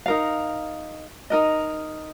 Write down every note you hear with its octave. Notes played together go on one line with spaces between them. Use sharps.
D#4 A#4 F5
D#4 A#4 D#5